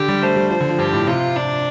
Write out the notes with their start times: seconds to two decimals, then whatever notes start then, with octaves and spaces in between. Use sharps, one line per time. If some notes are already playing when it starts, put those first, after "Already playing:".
Already playing: D3 G4
0.08 G3
0.22 A3 C5
0.36 G3
0.50 F3 C5
0.61 D3
0.69 F3
0.78 G2 G4
0.93 A2
1.07 C3 F4
1.36 D4